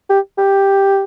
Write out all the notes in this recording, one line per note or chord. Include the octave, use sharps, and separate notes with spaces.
G4
G4